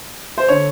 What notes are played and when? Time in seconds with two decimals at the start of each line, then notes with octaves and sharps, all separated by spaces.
0.38 C5
0.48 D3 C#5